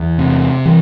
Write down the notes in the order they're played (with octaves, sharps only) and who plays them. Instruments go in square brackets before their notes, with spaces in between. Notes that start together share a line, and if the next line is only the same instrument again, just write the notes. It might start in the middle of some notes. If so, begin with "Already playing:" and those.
Already playing: [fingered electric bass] E2
C3
E3